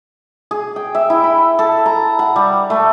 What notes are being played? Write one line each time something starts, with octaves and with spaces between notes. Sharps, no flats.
G#4
G5
E5
E4
B5
A4
A#5
F#5
G3
A3